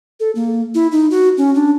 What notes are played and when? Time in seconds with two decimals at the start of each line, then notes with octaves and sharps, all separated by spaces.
0.20 A4
0.35 A#3
0.74 E4
0.92 D#4
1.11 F#4
1.37 C#4
1.55 D4